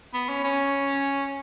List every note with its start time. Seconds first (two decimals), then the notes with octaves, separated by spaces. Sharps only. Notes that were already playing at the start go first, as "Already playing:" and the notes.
0.14 B3
0.29 C#4
0.44 C#4